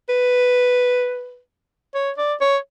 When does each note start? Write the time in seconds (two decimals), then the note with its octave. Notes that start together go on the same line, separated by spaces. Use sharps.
0.09 B4
1.95 C#5
2.18 D5
2.41 C#5